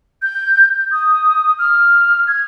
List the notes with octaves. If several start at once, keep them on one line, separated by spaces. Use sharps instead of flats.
G6
D#6
F6
G#6